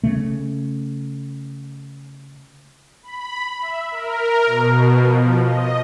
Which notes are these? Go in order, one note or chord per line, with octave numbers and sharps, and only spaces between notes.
C#3 A3
B5
E5
A#4
B2
F3
D#5